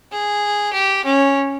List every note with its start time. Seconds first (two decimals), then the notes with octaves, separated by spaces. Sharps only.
0.12 G#4
0.73 G4
1.05 C#4